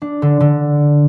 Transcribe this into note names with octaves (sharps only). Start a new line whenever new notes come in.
D4
D3
D3